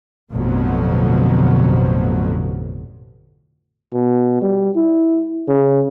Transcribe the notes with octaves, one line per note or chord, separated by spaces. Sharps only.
A1 F2 B2 D3 F3 F#3
B2
G3
E4
C#3